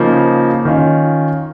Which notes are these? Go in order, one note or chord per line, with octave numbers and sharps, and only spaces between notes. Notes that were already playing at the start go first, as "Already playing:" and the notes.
Already playing: C#3 F3 A#3 D#4
D#3 C#4 F4